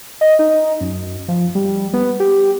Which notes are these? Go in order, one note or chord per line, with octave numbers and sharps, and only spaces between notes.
D#5
D#4
F#2
F3
G3
B3
G4